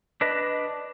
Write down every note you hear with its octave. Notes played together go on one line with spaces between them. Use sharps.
D4 B4 D#5